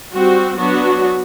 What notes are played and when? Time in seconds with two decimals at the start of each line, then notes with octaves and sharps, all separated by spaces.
0.13 G3 C4 F#4
0.58 F#3 B3 D4 F#4